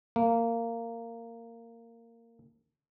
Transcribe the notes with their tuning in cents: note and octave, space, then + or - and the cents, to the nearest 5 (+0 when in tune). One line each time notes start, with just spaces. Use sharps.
A#3 -15